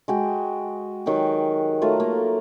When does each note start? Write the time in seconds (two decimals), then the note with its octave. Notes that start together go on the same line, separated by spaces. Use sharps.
0.08 G#3 F#4 G5
1.06 D#3 F#3 F#4 G4
1.82 F#3 A3 F4 A#4
2.00 A#3